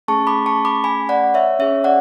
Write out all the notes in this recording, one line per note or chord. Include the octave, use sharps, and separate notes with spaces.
A3 C#4 G#4 A5 C#6
B5 D6
A5 C#6
B5 D6
G#5 B5
D5 F#5
C#5 E5
C#4 G#4 C#5 E5
D5 F#5